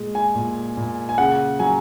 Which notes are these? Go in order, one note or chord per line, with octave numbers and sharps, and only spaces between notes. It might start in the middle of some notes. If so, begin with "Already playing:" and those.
Already playing: A#2 G#3
G#5
A#2
A#2
G#5
C#3 F#5
F#3 G#5